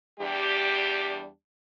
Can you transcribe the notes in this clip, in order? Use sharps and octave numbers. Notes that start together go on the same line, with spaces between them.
E2 G3 D4 G4